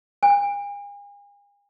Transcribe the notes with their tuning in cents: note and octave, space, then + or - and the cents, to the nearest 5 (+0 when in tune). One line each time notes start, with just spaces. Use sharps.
G#5 -40